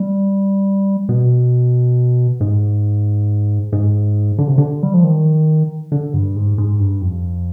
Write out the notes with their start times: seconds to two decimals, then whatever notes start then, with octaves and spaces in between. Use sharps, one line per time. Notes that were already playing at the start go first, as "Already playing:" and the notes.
Already playing: G3
1.09 B2
2.41 G#2
3.72 G#2
4.38 D3
4.48 C3
4.58 D3
4.83 G3
4.94 F3
5.04 D#3
5.92 D3
6.14 G2
6.36 G#2
6.58 G#2
6.80 G2
7.02 F2